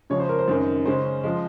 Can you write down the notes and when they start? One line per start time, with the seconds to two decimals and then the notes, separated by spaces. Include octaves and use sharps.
0.10 C#3 F3 G#3 C#5
0.20 C5
0.29 A#4
0.39 C5
0.48 F#2 D#3 G#3 C4 A#4
0.85 C#3 G#3 C#4 C5
1.24 F3 G#3